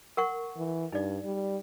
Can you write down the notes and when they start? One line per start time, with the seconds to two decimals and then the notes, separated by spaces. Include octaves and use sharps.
0.17 A#4 F#5 C#6
0.57 E3
0.92 G2 D#4 D5
1.25 G3